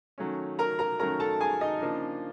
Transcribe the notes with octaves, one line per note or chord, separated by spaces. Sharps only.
D#3 F#3 A3 C#4
A#4 A#5
A#4 A#5
D#3 F#3 A3 C#4 A#4 A#5
A4 A5
G#4 G#5
D#4 D#5
C#3 F3 A#3 D4